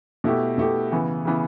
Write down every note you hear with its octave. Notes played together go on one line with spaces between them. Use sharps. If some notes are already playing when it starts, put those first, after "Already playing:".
B2 A3 E4 G4
B2 A3 E4 G4
C#3 E3 B3
C#3 E3 B3